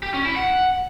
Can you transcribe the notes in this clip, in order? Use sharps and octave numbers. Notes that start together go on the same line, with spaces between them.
G4
C#4
E4
F#5